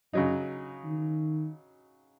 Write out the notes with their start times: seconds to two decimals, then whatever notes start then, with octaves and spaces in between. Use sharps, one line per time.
0.13 F#2 C#3 F#3 D#4
0.85 D#3